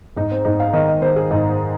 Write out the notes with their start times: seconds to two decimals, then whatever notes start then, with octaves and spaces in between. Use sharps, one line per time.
0.16 G#2 D#4
0.31 C4
0.45 G#2 D#4
0.60 F5
0.73 D#3 D#5
0.88 D#5
1.02 D#3 C5
1.16 G#4
1.31 G#2 D#4